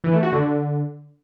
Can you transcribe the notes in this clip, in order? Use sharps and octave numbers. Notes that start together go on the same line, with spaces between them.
E3
A3
F#4
D3